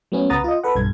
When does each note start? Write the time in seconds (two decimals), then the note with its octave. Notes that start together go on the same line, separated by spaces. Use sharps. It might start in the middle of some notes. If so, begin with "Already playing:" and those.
0.12 F#3 A3 B3 C#4
0.30 C#2 B4 F#5 A#5 D#6 A6
0.44 F4 D#5
0.64 A4 B4 F#5
0.75 B1 G2 G#6